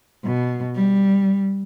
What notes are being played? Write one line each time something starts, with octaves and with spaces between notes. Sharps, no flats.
B2
G3